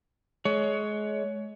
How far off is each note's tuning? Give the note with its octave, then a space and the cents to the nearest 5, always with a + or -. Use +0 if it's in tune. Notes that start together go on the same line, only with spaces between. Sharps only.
G#3 +30 C#5 +20